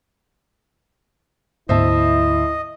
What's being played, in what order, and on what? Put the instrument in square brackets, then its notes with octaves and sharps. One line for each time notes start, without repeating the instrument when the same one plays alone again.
[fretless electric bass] D2 G#2 B3 [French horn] E4 [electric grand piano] C5 E5 A5 [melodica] D#5